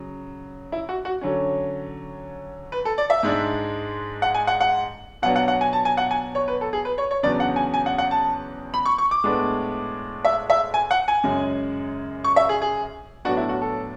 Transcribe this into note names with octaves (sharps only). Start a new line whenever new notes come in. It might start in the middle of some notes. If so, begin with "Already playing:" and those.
Already playing: C#3 F#3
E4
F#4
F#4
D3 F#3 C#4
B4
A4
D5
E5
G#2 G#3 D4
F#5
G#5
F#5
F#5
B2 F#3 B3 D4 F#5
F#5
F#5
G#5
A5
G#5
F#5
G#5
C#5
B4
A4
G#4
B4
C#5
C#5
E2 C#3 F#3 B3 D4 D5
F#5
G#5
G#5
F#5
F#5
A5
B5
C#6
C#6
D6
A2 G#3 B3 D4
E5
E5
G#5
F#5
G#5
F#2 C#3 G#3
C#6
E5
G#4
G#4
A2 F#3 B3 D4 F#4
E4
F#4
A4